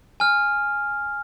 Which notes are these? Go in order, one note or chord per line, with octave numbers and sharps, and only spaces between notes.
G#5 F6